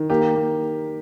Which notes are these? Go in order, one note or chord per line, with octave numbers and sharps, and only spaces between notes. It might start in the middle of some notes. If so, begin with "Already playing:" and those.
Already playing: D#3
A#3 G4
A#3